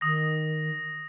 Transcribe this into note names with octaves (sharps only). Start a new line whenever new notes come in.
D#3 D#6 A#6